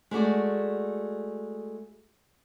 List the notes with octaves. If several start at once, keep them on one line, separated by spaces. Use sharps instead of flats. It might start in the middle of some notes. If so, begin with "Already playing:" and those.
G#3 A3 F#4 D5